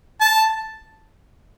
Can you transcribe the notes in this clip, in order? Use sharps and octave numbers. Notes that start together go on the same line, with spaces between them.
A5